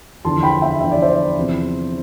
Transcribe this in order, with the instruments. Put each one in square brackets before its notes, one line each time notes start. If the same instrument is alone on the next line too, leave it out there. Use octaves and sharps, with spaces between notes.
[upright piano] E2 D3 F3 A5 C6
G5 B5
E5 G5
E2 D3 F3 E5
D5
C5 E5
E2 C3 F3 C4